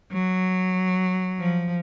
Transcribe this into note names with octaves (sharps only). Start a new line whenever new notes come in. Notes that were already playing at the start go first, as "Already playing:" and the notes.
F#3
F3